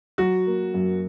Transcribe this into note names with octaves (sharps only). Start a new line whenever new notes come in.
F#3 F#4
A#3
F#2